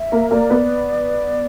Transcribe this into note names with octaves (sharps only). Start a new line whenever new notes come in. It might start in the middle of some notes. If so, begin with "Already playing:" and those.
Already playing: E5
A#3 A#4
A#3 A#4 D5
B3 B4